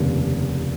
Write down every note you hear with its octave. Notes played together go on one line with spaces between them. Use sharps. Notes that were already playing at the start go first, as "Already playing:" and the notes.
Already playing: F1 D#2 C#3